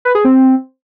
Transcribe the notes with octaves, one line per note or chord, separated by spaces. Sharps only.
B4
G#4
C4